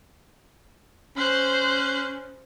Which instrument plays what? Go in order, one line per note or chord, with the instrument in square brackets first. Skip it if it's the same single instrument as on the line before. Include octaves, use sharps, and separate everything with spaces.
[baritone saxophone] C#4 [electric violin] C5 F#6